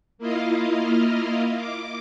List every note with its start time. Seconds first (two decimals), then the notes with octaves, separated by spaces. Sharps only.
0.18 A#3 E4 F4 D#5 F5
1.57 D6